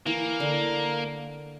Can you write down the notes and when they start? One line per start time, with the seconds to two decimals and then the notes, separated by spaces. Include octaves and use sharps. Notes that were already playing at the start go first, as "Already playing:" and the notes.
0.07 E3 A#3
0.40 D3